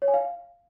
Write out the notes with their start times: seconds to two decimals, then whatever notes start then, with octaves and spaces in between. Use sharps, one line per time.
0.02 C#5
0.08 G#5
0.14 F5